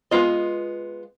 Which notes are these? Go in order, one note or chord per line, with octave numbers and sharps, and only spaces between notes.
G#3 B3 E4 F4 D#5